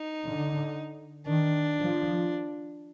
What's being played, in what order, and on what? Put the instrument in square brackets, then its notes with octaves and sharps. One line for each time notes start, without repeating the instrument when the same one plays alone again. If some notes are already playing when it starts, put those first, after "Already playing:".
Already playing: [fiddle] D#4
[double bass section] D3
[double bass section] D#3 [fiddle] D4
[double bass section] F3